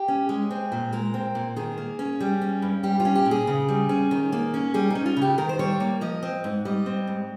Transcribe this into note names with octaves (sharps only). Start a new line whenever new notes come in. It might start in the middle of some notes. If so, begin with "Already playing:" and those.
Already playing: G4
C#4
G#3
C4
A#2
G#3 A#4
C4
A#2
D#3 G#4
A#3
C#4
G3
C#4
G2
G3 G4
F4
C#4
G4
A#2
G#4
C#3
G3
C#4
D#3
A#3
C#4
G3 G#4
C#4 D#4
F4
C#3
G4
D#3 A#4
C5
G3 C#5
A#3
F3 D#5
C4
G#2
G3 D#5
C4
G#2